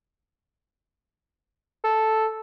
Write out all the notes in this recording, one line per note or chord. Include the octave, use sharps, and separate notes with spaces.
A4